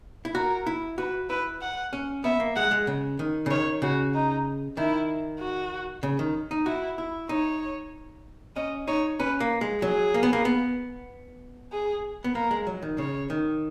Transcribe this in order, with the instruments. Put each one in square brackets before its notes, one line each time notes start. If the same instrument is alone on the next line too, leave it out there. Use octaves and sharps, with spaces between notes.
[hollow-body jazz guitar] E4
[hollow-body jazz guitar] F#4 [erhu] A#4
[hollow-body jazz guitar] E4
[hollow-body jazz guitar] F#4 [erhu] B4
[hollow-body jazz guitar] E4 [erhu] B4
[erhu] F#5
[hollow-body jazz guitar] C#4
[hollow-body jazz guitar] B3 [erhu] E5
[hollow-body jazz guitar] A#3
[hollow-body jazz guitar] G#3 [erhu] F#5
[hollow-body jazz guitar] G#3
C#3
D#3
C#3
[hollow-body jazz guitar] D#3 [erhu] C#5
[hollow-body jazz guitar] C#3 [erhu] F#4
[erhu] D#4
[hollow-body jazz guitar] D#3 [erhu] E4
[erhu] F#4
[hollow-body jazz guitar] C#3
D#3
D#4
[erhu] E4 [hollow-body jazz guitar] F#4
[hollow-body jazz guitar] E4
[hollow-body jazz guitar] D#4 [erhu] C#5
[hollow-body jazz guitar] C#4 [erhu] D#5
[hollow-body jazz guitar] D#4 [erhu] C#5
[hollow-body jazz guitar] C#4 [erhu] B4
[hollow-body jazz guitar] A#3
G#3
[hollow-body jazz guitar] F#3 [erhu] G#4
[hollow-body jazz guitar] A#3
B3
A#3
B3
[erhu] G#4
[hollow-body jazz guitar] B3
[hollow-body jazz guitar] A#3 [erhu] A#4
[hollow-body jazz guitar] G#3
F#3
D#3
[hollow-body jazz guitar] C#3 [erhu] C#5
[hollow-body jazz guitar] D#3